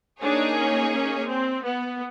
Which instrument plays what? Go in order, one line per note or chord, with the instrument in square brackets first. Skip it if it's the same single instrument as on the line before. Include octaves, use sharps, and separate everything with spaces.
[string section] A#3 D#4 G#4 C#5 [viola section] D4
[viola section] C#4
C#4
C4
B3